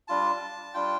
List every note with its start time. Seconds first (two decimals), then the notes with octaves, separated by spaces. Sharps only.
0.08 G3 D4 F4 A5
0.74 G3 D4 F4 G5